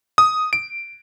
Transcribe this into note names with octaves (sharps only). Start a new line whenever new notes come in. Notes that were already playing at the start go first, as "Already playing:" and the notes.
D#6
D7